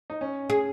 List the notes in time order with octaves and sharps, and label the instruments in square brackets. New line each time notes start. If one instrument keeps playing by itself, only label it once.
[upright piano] D#4
C#4
[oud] G#4